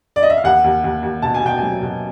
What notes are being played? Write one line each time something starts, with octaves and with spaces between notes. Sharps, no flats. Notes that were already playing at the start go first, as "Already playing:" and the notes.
D5
D#5
E5
F5
D#2 F#5
D#2
D#2
D#2
B2 A5
G#5
B2 G5
F#3 G#5
B2